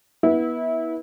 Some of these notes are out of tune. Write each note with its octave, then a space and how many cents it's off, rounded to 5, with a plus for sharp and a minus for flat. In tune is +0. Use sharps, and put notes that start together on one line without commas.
B3 -25 E4 -25